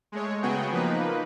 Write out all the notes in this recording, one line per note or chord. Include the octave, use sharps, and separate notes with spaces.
G#3 A3 C#5
C#3 F#3 B3 F#4 G#4 G5
F3 A#3 D#4 B4